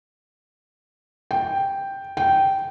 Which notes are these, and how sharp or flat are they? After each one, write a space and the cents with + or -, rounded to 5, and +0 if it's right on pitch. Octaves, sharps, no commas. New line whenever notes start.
G5 +0
G5 -15